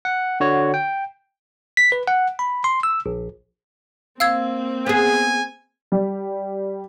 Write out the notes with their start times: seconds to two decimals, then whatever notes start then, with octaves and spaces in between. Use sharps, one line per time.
0.05 F#5
0.40 D3 F#4 C#5
0.74 G5
1.77 B6
1.92 B4
2.08 F#5
2.39 B5
2.64 C6
2.83 E6
3.06 A#1
4.20 A#3 C4 F5 E6 G#6
4.86 B3 G#4 G#5
5.92 G3